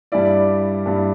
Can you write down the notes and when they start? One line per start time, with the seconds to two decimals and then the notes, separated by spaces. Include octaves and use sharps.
0.12 G2 G3 E4 D5
0.86 G2 G3 E4